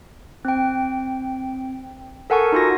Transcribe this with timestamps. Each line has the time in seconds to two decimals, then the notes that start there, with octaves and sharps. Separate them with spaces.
0.45 C4 G5
2.30 A4 A#4 F#5 G#5 A5 C#6
2.52 D#4 F4 F#4 A#6